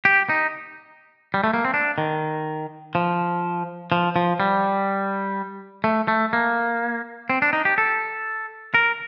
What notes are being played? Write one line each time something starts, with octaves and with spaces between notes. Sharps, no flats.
G4
D#4
G3
A3
A#3
C4
D4
D#3
F3
F3
F3
G3
A3
A3
A#3
C4
D4
D#4
G4
A4
A#4